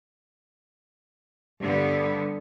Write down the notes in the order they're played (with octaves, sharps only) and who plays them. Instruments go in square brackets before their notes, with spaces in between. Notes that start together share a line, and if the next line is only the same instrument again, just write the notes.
[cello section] G2 D3 B3 [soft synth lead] G3